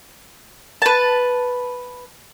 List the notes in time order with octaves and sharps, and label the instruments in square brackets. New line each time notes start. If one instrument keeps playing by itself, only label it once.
[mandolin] B4 A5